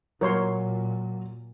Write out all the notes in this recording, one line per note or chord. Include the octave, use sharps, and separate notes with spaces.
A#2 F#3 A#4 C#5 C6